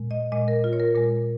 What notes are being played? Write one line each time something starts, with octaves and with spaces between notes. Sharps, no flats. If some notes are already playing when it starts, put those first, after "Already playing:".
Already playing: A#2 G#3
D#5
A#2 G#3 D#5
A#4
F4
C#5
A#4
A#2 G#3 A#4